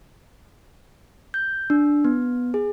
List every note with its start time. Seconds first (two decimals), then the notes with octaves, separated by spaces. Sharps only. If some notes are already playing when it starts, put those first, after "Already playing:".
1.34 G6
1.70 D4
2.05 B3
2.54 G#4